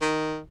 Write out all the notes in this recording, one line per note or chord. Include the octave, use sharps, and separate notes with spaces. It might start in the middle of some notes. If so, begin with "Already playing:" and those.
D#3